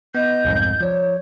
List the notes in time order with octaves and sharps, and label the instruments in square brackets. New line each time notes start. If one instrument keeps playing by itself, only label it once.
[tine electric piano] B3 [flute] D#5 [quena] G6
[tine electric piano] C2 F2 G#2
[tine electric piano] F3 D5 [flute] C#5